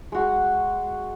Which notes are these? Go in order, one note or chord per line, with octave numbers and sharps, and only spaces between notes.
G#3 F#4